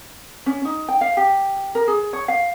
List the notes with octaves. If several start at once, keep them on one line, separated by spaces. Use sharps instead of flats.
C#4
D#4
G5
F5
G4
A#4
G#4
C#5
F5